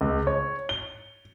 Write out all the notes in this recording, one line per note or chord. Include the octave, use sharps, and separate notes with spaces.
C#2
C#5
G7